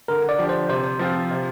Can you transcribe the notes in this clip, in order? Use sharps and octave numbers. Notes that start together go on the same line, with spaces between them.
D3 A#4
D5
F3 D4 G4
C5
C3 C5
F3 C4 F4
C3